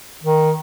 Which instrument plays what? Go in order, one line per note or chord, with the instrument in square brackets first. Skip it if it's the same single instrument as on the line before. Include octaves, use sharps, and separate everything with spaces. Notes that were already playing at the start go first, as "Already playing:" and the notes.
[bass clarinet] D#3